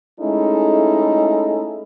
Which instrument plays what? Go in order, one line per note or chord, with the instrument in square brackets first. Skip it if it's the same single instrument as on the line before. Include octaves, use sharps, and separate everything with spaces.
[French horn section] G#3 A3 C#4 D#4 E4 A4